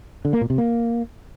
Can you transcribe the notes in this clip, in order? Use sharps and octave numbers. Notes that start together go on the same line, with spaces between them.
D3
A#3
A#2
C3
A#3